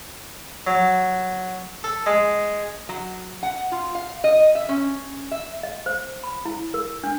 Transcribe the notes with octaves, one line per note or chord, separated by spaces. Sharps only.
F#3
A4
G#3
F#3
F#5
F4
F5
D#5
E5
C#4
E5
D#5
C5
B5
E4
A#4
D4